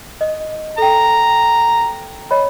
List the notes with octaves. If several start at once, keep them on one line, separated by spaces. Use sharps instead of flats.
D#5
A4 G5 A#5
C#5 D#5 B5